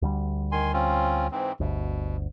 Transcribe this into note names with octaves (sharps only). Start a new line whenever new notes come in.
D2 D3 G3
D#3 G#5 C6
C4 C#4 F4
G#2 E3 C4
G1 D2 B2